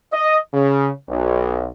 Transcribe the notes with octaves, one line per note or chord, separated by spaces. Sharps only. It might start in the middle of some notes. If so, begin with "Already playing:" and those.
D#5
C#3
B1